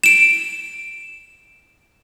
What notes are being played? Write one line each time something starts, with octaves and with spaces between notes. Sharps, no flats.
D7 E7